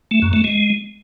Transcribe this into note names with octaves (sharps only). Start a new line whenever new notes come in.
A3
F#2
A3
G#3